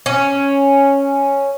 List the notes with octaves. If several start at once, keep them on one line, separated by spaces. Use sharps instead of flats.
C#4